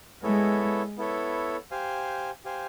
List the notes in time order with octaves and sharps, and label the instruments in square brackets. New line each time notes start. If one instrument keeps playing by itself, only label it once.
[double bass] G#3 [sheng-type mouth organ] B3 E4 A4 C#5
[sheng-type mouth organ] B3 E4 A4 C#5
G4 C5 F5 G#5
G4 C5 F5 G#5